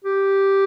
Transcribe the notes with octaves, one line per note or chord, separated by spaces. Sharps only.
G4